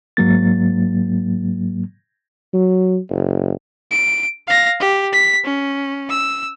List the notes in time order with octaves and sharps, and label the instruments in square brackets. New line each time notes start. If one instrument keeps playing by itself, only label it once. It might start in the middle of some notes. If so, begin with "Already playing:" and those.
[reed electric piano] G#2 F#3 A#3 A6
[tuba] F#3
F#1
[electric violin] D7
F5 A#6
G4
B6
C#4
E6